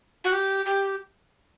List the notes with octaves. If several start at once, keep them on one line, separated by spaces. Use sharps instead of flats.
F#4
G4
G4